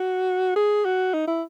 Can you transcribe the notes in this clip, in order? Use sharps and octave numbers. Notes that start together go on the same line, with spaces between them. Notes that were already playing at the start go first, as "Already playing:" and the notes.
Already playing: F#4
G#4
F#4
D#4
E4